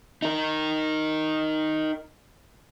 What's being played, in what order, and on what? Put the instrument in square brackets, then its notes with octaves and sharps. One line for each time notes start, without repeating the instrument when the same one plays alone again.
[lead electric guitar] D#4 A#4